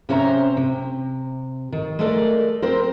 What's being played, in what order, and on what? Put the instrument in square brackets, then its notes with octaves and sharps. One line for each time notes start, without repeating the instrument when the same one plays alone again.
[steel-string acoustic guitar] C3 C#4 C5 E5 A5 A#5
C3
D#3
G#3 A3 A4 A#4 D5
C4 A#4 C5